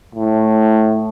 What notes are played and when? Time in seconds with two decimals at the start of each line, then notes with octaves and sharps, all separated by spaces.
0.15 A2